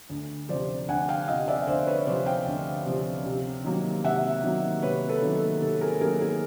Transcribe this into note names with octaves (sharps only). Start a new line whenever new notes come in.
D2
C3 F3 C5 D5
D2 F#5 G#5
F5 G5
C3 F3 D#5 F5
D5 E5
D2 C5 D5
B4 C#5
C#5
C3 F3 C5 D5
F5 G5
D2
C3 F3
C3
D#3 F#3 A#3
C3 E5 F#5
D#3 F#3 A#3
C3 B4 C#5
A4 B4
D#3 F#3 A#3
A4
C3 A4
G#4 A#4
D#3 F#3 A#3 G#4 A#4
G#4